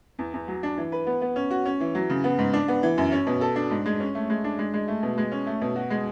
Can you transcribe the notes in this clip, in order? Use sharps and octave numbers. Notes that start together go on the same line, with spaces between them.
E2
E2
F#3
D4
E3
B4
B3
B3
C#4
F#4
C#4
E3
F#3
C#3
B3
G#2
D4
B3
E3
F#2
C#4
B2
A4
D4
G#2
G#3
C#4
A3
G#3
D4
G#3
G#3
A3
B2
G#3
C#4
A3
B2
F#4
G#3